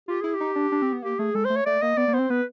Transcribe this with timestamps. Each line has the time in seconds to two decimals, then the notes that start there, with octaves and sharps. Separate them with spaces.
0.08 F4 G4
0.21 E4 G#4
0.34 G4
0.40 D#4
0.56 D4
0.72 D4
0.82 C4
0.92 B3
1.02 A#3 G4
1.19 A3 G#4
1.34 G#3 A4
1.45 C5
1.50 A3
1.56 C#5
1.66 A3 D5
1.82 A#3 D#5
1.97 B3 D5
2.08 A#3
2.13 B3 C5
2.19 C4
2.30 B3 B4